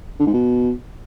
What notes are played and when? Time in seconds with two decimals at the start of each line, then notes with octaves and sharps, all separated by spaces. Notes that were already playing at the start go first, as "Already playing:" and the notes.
0.19 D3
0.26 G#2
0.33 B2